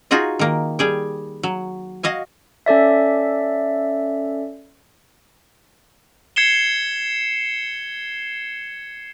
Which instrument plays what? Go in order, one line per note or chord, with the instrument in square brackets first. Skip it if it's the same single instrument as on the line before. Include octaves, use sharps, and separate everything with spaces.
[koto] D#4 F4 F#4 G#4 D#5
D#3 A#3
G3 G#4 G5
F#3
F#4 D#5 F5 G#5
[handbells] C#4 A4 D5 E5
[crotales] G#6 C7 C#7 E7 G7